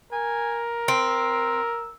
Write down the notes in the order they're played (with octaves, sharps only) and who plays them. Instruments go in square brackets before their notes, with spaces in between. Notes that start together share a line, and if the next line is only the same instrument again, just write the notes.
[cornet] A#4 [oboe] G#5
[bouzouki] C4 [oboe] E6